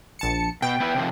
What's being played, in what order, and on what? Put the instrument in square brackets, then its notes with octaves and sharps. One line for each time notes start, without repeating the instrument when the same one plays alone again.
[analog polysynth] A#1 A5 C#7
[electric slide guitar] B2 [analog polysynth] G5
[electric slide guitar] B3 E4 B4
C3 D#3 F3